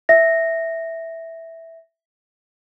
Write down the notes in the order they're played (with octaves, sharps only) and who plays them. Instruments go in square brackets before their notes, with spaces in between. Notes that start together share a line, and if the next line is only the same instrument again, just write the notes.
[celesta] E5 A#6